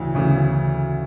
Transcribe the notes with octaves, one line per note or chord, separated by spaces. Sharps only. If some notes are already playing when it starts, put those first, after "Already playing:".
Already playing: D2 C#3 E3
D2 C#3 E3